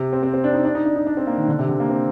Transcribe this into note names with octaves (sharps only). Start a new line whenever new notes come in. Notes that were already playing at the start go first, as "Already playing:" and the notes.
Already playing: C3
C4
C4
C4
D4
D#4
D4
D#4
D4
D#4
D4
C4
A#3
D#3
D3
C3
D3
A#3
C4